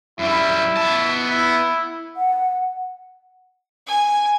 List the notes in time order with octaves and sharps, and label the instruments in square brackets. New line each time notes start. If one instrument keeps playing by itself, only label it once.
[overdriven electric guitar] F#2 G3 [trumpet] E4
[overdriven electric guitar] B3 A5
[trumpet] E4
[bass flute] F#5
[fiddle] G#5